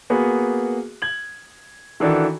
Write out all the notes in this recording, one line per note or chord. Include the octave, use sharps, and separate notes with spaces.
A#3 B3 F#4 G#4
G#6 F#7
D#3 E3 D4 F#4 A4